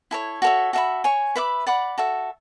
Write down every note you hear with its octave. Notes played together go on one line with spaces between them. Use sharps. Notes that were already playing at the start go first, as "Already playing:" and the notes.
E4 A4 C#5
F#4 A4 C#5 E5
F#4 A4 E5 B5
C#5 G#5 C#6
B4 E5 B5 D6
D5 F#5 B5 D6
F#4 A4 E5